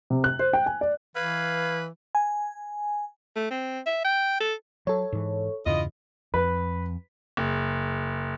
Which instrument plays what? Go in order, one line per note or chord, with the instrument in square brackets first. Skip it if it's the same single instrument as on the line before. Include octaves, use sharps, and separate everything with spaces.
[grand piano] C3
F#6
C5
G5
G#5
D5
[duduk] E3 [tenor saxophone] B4 [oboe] F5 [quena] G#6
[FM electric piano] G#5
[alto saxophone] A3
C4
E5
G5
A4
[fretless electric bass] F#3 [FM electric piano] A4 C#5
[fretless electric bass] G#2 E3
[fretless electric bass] E2 G2 C#3 [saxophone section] E4 F4 D#5
[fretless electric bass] F2 [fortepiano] B4
[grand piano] F#1